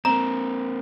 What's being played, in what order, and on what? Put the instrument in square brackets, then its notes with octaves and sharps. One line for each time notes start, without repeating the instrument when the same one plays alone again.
[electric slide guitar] A#3 C4 [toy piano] A#5